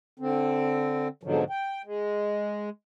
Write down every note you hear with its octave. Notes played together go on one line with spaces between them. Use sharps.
D3 C4
F2 G#2 B2 D3 F3 F#3
G5
G#3